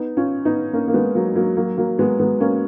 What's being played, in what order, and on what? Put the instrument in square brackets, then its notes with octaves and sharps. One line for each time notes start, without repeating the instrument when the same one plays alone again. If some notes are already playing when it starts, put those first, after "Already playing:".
Already playing: [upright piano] B3 D#4
C#4 F4
B3 D#4
A#3 C#4
A#3
G#3 B3
F#3 A#3
F#3 A#3
F#3 A#3
F#3 A#3
G#3 B3
G#3 B3
A#3 C#4